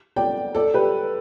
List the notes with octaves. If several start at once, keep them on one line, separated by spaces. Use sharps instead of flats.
D5 G5
A4 D5
G4 B4